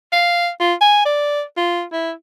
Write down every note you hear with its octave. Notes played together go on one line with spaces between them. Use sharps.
F5
F4
G#5
D5
F4
E4